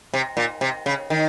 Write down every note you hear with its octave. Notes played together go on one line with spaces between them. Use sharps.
C3
A#2
C3
C#3
D#3